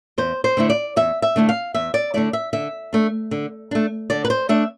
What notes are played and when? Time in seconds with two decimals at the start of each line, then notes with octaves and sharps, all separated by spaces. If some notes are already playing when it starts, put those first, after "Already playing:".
0.18 E2 C5
0.44 C5
0.57 D3 A3 E4
0.70 D5
0.96 E2 E5
1.22 E5
1.36 D3 A3 E4
1.49 F5
1.74 E2 E5
1.94 D5
2.14 D3 A3 E4 D5
2.33 E5
2.53 D3 E5
2.93 A3 D4
3.31 D3
3.71 A3 D4
4.10 D3 D5
4.25 B4
4.30 C5
4.49 A3 D4 E5